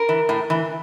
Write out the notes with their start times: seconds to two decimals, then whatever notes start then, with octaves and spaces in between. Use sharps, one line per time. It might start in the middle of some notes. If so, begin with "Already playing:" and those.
Already playing: A#4
0.09 E3
0.29 A2
0.50 E3